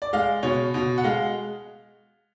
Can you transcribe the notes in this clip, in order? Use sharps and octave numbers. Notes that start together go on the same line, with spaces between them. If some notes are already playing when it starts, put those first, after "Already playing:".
D5
G#3 F5
B2 C#5
B2
F#5
G#3 F5